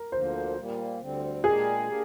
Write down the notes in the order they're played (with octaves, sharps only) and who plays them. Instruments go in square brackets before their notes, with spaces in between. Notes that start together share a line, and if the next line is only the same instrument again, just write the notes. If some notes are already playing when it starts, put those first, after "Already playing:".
Already playing: [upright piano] A#4
[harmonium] D2 D3 F3 A#3 [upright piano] C5
[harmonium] A#2 G3 A#3
D2 D3 G3 C4
[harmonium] A#2 G#3 D4 G4 A#4 [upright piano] G#4
[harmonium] A#3 D4 G4 A#4